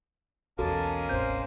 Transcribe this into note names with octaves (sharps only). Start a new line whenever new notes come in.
B1 E2 G#3 A#3 C#4 F#4 A4 A5
E1 A1 C4 C5 G6